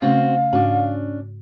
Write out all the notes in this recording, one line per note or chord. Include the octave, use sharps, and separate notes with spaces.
C#3 A3 C4 C#4 F#4 F5
G#2 C#4 D4 F#4